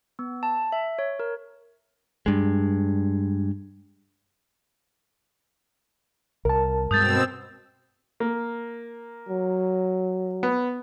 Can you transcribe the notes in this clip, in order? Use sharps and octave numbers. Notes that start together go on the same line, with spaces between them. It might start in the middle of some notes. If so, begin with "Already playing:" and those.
B3
A5
E5
C#5
A#4
G2 G#3
C2 A#4 A5
G2 B2 G#3 C4 D#6 E6 G6 A6
A#3
F#3
B3